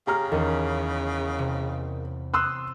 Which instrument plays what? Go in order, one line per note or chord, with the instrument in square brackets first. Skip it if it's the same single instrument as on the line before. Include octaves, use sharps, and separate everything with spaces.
[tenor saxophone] C#3 [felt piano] G4 A#5 F6
[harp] E2 C#4 [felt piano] D#3
[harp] C3
[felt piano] C6 E6 F#6 [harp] D#6